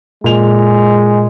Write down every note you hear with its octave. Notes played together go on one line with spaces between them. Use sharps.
A#2 G#3 F7